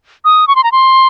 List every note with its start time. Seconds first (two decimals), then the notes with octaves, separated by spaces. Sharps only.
0.25 D#6
0.48 C#6
0.56 C6
0.64 A#5
0.72 C6